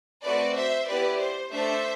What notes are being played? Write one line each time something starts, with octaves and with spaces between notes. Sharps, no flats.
A3 C4 F#4 B4 D5
C5 E5
B3 E4 G4 B4 D5
C5
A3 D4 A4 C5 E5